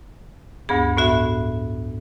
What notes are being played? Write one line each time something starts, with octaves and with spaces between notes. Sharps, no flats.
D2 G2 B3 G#4
A2 B3 F#4 E5